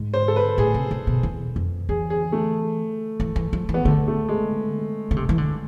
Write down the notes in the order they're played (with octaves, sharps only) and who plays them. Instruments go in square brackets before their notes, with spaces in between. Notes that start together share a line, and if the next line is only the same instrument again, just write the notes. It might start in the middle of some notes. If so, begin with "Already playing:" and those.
Already playing: [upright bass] G#2
[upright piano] C5
A4
B4
[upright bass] A2 [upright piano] G#4
[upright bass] C3
D3
B2
E2
F2
[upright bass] E3 [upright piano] G#4
[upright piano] G#4
A3
[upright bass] E3
E3
F3
E3
[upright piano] B3
[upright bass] D3 [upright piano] A3
[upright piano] A3
G#3
[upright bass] D3
C3
E3
D3